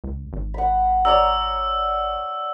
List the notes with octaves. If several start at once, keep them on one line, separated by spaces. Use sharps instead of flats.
C#2
G#1
F#5 B5
C#5 D5 A#5 E6